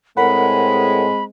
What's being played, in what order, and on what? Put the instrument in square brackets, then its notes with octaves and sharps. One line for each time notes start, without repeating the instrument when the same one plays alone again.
[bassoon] A2 [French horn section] G#3 C4 [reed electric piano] A#4 F#5 [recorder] B5